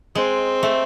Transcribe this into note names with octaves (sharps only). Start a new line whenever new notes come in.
G#3 C4
A3